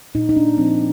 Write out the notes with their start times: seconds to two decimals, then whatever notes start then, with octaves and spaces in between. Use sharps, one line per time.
0.15 A#2 D#4
0.29 D#4
0.36 D4
0.58 F3 C4